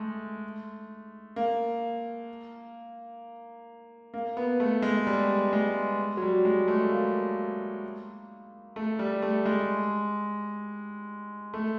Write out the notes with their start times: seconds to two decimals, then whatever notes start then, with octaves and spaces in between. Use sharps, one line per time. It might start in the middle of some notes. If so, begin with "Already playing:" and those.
Already playing: G#3 A3
1.36 A#3
4.14 A#3
4.37 B3
4.60 A3
4.82 G#3
5.07 G3
5.53 G#3
6.17 F#3
6.22 G3
6.45 G#3
6.68 A3
6.91 A#3
8.76 A3
8.99 G3
9.22 A3
9.46 G#3
11.54 A3